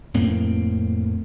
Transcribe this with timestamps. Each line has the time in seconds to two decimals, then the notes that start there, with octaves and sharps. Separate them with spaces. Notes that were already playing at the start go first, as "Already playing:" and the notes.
0.14 F2 A2 A#3 C4